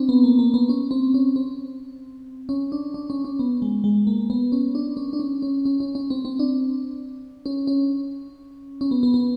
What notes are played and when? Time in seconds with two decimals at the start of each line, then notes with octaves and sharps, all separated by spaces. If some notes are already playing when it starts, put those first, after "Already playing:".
Already playing: C4 D4
0.09 B3
0.24 A#3
0.39 A#3
0.54 B3
0.69 C#4
0.91 C4
1.14 C#4
1.36 C4
2.49 C#4
2.72 D4
2.94 D4
3.10 C#4
3.25 C#4
3.39 B3
3.62 G#3
3.84 G#3
4.07 A#3
4.30 B3
4.52 C#4
4.75 D4
4.97 C#4
5.13 D4
5.20 C#4
5.42 C#4
5.65 C#4
5.80 C#4
5.95 C#4
6.10 C4
6.25 C4
6.39 D4
7.46 C#4
7.67 C#4
8.81 C#4
8.91 B3
9.03 B3
9.14 B3